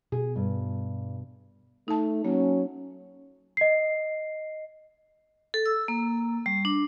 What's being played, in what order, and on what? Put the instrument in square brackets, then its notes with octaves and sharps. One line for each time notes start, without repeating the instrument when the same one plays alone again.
[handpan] B2 [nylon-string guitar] G#4
[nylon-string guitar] G2
[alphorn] A3 [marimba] D#4 A5
[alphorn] F#3 [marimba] A#3 [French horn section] C#4
[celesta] D#5 C7
[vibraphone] A4
E6
A#3
G3
D4